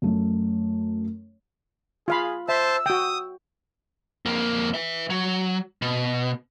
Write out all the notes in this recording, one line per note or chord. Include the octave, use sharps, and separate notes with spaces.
F#2 A3
F4 G#4 F5 B5
C5 E5 A5 E6
F#4 G5 D#6
F2 A#3
B4 E5
F#3
B2